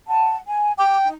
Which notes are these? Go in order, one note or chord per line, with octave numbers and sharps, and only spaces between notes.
F#5 A5
G#5
G5 D6
D#4